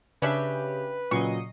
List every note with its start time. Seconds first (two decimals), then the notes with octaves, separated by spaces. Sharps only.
0.22 C#3 C#4 D4 G4 B4 E5
1.11 A#2 C#3 F#3 D#5 C#6 C7 C#7